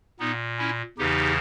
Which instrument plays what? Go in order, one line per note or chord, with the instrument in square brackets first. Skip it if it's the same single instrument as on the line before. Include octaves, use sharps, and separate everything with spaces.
[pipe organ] A#2 B3 D#4
C#4 E4
E2 C#3 E3 D#4 G4